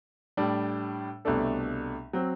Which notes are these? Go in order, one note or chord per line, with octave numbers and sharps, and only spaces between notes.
A2 G3 D4
C2 B2 A3 D4 A4
F#3 C4